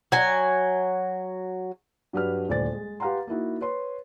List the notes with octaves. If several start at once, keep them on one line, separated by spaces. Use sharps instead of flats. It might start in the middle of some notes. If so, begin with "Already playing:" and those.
F#3 G#5
G2 F#3 G4 B4 D5 F6
D#1 D2 C5 D5 A6
G#3
G4 B4 F5 F#5 A#5 C6
A#3 D#4 E4 F#4
B4 C#5 C6